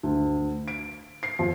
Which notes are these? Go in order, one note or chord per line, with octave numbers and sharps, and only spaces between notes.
D2
D7
C7
F2